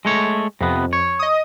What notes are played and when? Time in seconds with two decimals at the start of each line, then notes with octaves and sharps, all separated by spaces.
0.05 G#3 A3 C#5
0.61 F2 C3 B3
0.93 C#5
1.19 D#5 D#6